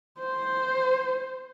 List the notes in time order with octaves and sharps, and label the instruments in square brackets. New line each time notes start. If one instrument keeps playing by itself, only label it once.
[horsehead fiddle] C5